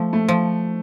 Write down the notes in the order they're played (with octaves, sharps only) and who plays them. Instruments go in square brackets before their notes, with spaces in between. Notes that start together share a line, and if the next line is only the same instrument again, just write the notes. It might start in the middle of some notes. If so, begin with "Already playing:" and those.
Already playing: [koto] F3 [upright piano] A3
[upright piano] A3
[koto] F3